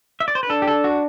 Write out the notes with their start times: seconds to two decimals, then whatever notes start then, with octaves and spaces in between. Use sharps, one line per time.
0.20 E5
0.28 D5
0.35 C5
0.43 B4
0.49 D4 A4
0.62 G4
0.67 A4
0.84 F#4